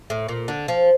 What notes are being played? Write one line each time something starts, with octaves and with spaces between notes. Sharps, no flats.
A2
A#2
D3
F3